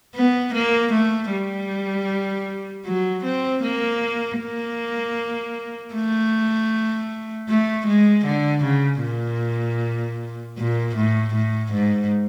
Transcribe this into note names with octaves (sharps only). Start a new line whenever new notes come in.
B3
A#3
A3
G3
F#3
C4
A#3
A#3
A3
A3
G#3
D3
C#3
A#2
A#2
A2
A2
G#2